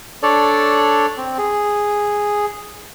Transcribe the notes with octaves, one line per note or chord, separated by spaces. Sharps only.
D4 A4 C#5 D5
C4
G#4